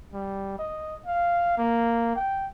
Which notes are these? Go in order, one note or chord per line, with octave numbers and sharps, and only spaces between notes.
G3
D#5
F5
A#3
G5